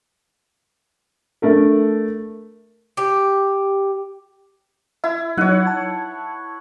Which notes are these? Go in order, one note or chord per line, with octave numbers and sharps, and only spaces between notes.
A3 D4 A#4
G4
E4 E5
F#3 D#4 C#5 F#5
A5